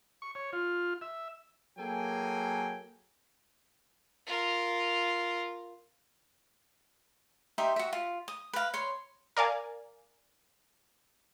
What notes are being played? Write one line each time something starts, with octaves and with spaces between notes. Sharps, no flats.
C#6
C#5
F4
E5
F#3 A#3 G#4 A4 G5 G#5
F4 A#4
D#4 G4 E5 C6
F#4 E5
F4
D#6
B4 F5
C#5 C6
A#4 D5 F5 G#5